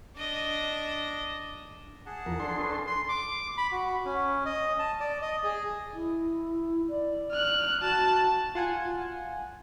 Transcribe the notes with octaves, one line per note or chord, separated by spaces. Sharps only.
D4 D#5
G#4 F#5 A5
E2 F3 A#4
D4 A4 C6
C#4 B4
C6
D6
B5
F#4
C#4
D#5
A5
D5
D#5
G#4
E4
D5
F6 F#6
F#4 A5
F4 F#5 G#5